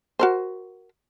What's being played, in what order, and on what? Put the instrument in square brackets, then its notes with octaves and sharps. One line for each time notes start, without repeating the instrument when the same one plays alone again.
[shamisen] F#4 A#4 C5